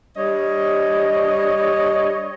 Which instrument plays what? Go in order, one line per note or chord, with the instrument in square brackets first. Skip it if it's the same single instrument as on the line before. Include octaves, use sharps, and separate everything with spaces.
[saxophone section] G3 D4 C#5 D#5